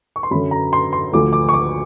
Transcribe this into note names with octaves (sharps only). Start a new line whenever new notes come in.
C#6
C6
F#2 D3 F#3 B5
A#5
C6
C6
D2 D3 F3 A3 D6
D6
C#6
D6